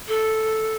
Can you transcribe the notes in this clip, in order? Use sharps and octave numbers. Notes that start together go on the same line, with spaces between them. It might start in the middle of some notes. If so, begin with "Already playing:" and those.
A4